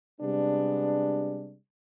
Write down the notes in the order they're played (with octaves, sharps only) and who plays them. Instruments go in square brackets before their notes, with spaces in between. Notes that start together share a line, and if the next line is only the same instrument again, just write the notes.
[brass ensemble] C3 G3 G#3 B3 D4